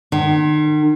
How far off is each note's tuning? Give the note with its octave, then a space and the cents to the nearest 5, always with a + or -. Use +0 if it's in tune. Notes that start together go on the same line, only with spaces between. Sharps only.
D#3 -40